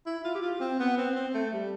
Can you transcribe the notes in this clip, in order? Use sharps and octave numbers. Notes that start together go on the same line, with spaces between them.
E4
F4
G4
F4
C4
B3
C4
C4
A3
G3